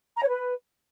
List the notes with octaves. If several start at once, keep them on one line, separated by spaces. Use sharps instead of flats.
A#5
C#5
B4